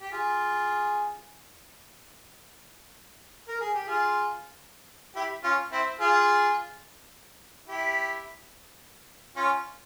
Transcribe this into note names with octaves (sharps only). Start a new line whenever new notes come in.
G4
F4 G#4
A#4
G#4
G4
F4 G#4
E4 G4
C#4 F4
C4 E4
F4 G#4
E4 G4
C#4 F4